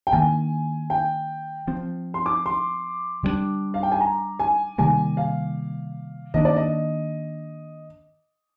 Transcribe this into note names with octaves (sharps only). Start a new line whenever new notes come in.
G5
D#3 A#3 D4 G#5
G5
F3 C4
C6
D6
C6
D3 G3 A#3 D4
F5
G5
G#5
A#5
G#5
C3 D#3 G3 A#3 G#5
F5
D#3 A#3 D4 D#5
D5
D#5